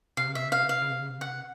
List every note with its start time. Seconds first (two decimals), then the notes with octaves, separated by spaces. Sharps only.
0.17 C3 F5
0.27 C#3
0.35 C3 E5
0.45 C#3
0.52 C3 F5
0.64 C#3
0.69 C3 F5
0.82 C#3
0.91 C3
1.00 C#3
1.09 C3
1.18 C#3 F#5
1.27 C3